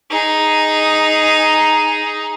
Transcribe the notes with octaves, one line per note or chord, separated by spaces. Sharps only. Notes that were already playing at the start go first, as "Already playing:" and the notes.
D#4 G#4